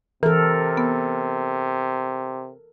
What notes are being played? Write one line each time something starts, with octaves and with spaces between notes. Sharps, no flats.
C3 E3 A4 A#4
B3